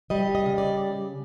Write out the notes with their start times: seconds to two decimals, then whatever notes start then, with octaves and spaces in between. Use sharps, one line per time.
0.10 G3 D#5
0.35 D#5
0.46 C#3
0.58 D5